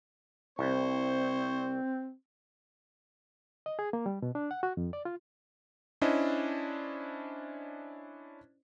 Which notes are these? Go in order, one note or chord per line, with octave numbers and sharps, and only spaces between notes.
C2 C4 C5 C#6
D#5
G#4
A#3
G3
B2
D4
F#5
F#4
F2
D5
F4
C#4 D4 E4 C5 D#5